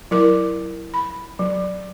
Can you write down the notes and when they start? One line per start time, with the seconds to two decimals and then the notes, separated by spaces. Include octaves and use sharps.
0.11 F#3 E4 A#4 D6
0.94 B5
1.39 F#3